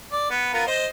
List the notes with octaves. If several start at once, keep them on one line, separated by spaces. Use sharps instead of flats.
D5
B3
B3 F4 A#4
C5 D#5